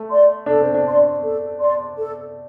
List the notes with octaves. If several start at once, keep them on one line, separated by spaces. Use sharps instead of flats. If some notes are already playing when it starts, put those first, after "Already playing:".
Already playing: A3
D5 C6
D4 A4
C4
D4
D5 C6
A4
D5 C6
A4